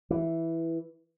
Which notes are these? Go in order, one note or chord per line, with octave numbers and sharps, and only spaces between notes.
E3